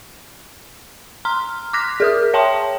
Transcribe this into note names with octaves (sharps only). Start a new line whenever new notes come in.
A#5 C6 F6
D6 F6 F#6 A#6 B6
G#4 A#4 D#6
C#5 E5 G5 A5 C6